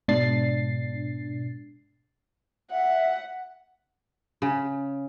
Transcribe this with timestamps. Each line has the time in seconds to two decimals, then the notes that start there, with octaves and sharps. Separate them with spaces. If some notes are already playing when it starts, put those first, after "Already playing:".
0.08 G#2 B2 D4 A6 C7
2.71 E5 F#5
4.42 C#3